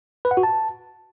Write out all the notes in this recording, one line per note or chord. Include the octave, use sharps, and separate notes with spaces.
B4
F#5
F#4
A5